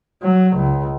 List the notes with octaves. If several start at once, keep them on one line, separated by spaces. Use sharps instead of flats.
F#3
C#2